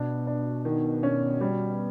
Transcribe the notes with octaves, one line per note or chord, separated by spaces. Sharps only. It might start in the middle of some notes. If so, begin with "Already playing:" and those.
Already playing: B2 D4
D4
D#3
C#4
G3